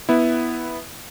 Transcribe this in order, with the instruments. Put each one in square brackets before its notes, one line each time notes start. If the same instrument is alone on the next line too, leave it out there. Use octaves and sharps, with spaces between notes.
[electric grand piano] B3 E4